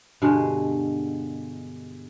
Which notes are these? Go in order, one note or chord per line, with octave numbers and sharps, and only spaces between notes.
G2 B2 D3 G#3